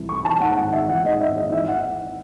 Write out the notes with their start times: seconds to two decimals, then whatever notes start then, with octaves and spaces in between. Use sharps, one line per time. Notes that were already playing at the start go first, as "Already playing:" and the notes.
Already playing: C2 C3 E3
0.09 A3 C#6
0.25 E3 A5
0.40 G#2 F#5
0.57 G#1 F#5
0.72 G#1 E5
0.89 E3 F#5
1.04 G#2 D#5
1.20 G#1 E5
1.37 G#1 D#5
1.52 E3 E5
1.68 F#5